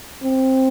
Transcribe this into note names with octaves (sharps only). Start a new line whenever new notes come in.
C4